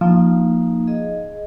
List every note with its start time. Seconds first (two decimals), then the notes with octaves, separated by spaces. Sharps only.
0.01 F3 A#3 D#4
0.87 G#4 D#5